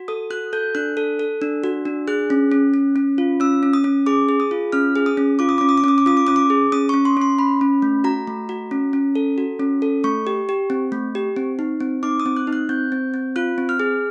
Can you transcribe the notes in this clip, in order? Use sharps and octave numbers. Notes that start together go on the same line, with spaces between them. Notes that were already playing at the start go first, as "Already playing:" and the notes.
Already playing: F#4
A4 D#6
F#4 F#6
A4 G6
D4 F#6
A4
A4
D4
F#4
D4
G#4 F#6
C#4
C#4
C#4
C#4
F4
C#4 E6
C#4
D#6
C#4
G#4 D6
G#4
D#6
F4
C#4 F6
G#4
D#6
C#4
F4 D6
D#6
C#4 D6
D#6
D6
C#4 D#6
D6
F4 D#6
D6
C#4 D#6
D6
G#4
C#4 D#6
C#4 C#6
C6
C#4 C6
C#4 B5
C#4
A3
F#4 A#5
A3
F#4
C#4
C#4
A4
F#4
C#4
A4
A3 C#6
G4
G4
C4
A3
G4
C4
D#4
C4
D#4 D6
D#6
C4
F#6
D#4
F#6
C4 G6
C4
C4
F4 F#6
C4
F6
G#4